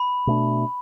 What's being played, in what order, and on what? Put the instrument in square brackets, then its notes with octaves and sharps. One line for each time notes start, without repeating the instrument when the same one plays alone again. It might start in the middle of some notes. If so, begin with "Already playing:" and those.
Already playing: [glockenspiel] B5
[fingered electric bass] B2 A3 D4